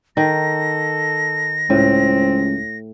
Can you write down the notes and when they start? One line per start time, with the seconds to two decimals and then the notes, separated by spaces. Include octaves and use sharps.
0.17 D#3 A4 A#6
1.70 C#2 A2 C4